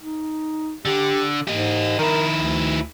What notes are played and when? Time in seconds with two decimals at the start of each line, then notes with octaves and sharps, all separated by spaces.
0.01 D#4
0.85 D3 G4
1.48 G#2 G4 D#5
1.99 D#3 E4 A#4
2.36 D2